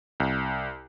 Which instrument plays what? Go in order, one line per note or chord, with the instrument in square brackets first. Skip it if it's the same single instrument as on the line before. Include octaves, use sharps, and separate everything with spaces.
[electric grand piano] C2